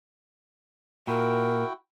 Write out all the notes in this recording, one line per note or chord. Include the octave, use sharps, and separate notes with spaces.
A#2 E4 F#4 A#4 G5